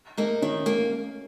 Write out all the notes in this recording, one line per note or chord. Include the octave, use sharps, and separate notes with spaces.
A#3 D#4
D#3 C#4
A#3